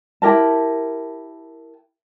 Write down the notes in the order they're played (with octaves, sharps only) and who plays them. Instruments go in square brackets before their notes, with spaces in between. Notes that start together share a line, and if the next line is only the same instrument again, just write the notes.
[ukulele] E4 G4 A#4 A5